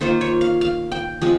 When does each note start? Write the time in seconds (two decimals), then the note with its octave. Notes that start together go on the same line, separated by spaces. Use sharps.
0.01 D#3 A#3 F4 C5
0.21 C#5
0.41 F5
0.61 F5
0.92 G5
1.21 F3 G#3 C4